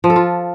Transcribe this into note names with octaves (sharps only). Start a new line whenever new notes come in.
F3
A4
F4